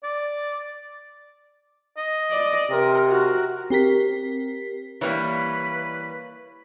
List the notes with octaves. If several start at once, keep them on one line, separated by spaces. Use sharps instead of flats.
D5
D#5
D5
C3 A#4
F#4 A#4
C4 G4 A#4 B6
E3 G3 A#3 B4 C#5